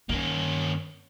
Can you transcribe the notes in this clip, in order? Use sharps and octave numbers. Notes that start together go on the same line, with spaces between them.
G2 D#3 A#3 C#4